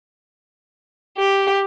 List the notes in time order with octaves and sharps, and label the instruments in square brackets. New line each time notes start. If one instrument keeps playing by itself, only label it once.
[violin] G4